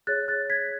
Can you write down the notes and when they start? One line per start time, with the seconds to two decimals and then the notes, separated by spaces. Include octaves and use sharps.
0.07 G#4 C#5 F#6 A6
0.28 F#6 A6
0.50 G#6 B6